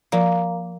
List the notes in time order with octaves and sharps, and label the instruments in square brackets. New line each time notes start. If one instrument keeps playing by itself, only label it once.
[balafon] F3 [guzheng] A#3